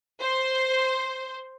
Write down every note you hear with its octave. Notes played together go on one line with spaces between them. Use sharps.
C5